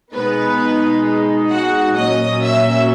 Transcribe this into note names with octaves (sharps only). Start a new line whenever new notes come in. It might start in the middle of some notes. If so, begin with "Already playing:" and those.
B2 G#3 B3 D#4 B4
F#4 F#5
A#2 F#3 C#4 D#5 D#6
E5 E6